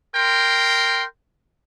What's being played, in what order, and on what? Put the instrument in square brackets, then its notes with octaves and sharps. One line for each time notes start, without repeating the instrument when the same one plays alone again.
[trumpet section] A#4 G5 C6